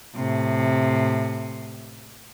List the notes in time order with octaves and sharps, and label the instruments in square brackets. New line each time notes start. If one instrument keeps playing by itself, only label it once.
[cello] A2 C3